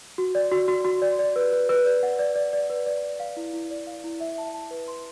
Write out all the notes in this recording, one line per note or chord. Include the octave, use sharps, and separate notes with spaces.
F#4
D5
F#4
F#4
F#4
D5
D5
B4
B4
B4
D5
F#5
D5
D5
D5
B4
D5
D5
F5
E4
E4
D5
F5
E4
E5
A5
A5
B4
C6